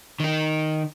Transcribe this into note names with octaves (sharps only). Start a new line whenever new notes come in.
D#3 D#4